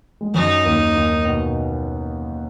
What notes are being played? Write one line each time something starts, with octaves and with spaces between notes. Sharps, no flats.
G#3
F#2 F#3 D#4
D#2 D#3
D#2 D#3
B2